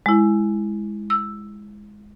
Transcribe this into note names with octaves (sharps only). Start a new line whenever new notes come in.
G#3 E4
E6